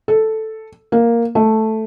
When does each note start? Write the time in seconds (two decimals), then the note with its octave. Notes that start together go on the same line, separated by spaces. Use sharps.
0.08 A4
0.92 A#3
1.35 A3